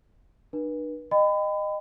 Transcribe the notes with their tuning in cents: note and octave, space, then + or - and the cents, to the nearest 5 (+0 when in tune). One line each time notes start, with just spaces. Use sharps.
D4 +40 B4 -35
D#5 -20 G5 +15 B5 +30